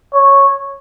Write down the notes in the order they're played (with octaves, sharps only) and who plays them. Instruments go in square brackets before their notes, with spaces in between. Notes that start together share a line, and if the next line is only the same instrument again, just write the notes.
[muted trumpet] C#5